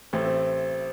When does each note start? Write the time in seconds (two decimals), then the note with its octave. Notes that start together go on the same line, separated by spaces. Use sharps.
0.13 A1 A3 C4
0.25 C4